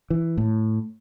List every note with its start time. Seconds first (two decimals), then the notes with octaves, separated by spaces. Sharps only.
0.10 E3
0.37 A2